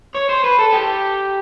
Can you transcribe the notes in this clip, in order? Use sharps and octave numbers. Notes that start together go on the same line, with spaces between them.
C#5
C5
B4
A4
G4